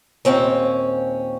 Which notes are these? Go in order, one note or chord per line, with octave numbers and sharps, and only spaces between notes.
D#2 A#2 C4 C#4